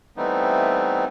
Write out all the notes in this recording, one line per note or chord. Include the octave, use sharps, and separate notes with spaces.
E3 G3 A3 B3 C4 D#4